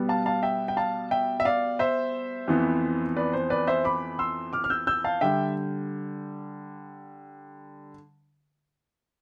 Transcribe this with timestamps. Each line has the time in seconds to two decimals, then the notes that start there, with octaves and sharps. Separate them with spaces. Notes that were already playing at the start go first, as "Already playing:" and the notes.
Already playing: B2 G3 B3
0.09 F5 A5
0.26 F5 A5
0.43 E5 G5
0.68 G5
0.77 F5 A5
1.11 E5 G5
1.40 E5
1.45 D5 F5
1.79 C5 E5
2.48 F2 E3 B3
3.17 B4 D5
3.33 C5
3.50 B4 D5
3.67 C5 E5
3.85 B5 D6
4.19 C6 E6
4.53 D6 F6
4.64 F6
4.70 E6 G6
4.87 E6 G6
5.04 F5 A5
5.21 D3 G3 E5 G5